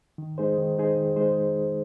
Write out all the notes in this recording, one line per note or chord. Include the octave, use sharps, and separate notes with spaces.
D#3
G#3 D#4 G#4 C5
D#3
G#3 D#4 G#4 C5
D#3
G#3 D#4 G#4 C5